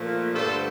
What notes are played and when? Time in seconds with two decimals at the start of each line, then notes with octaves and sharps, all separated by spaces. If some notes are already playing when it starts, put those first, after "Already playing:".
Already playing: A#2 F3 A3
0.34 G2 D3 A3 A4 C5